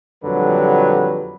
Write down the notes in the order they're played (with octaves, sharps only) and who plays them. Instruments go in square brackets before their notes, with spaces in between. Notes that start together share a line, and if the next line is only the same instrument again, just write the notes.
[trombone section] A#1 F2 D3 F#3 G3 B4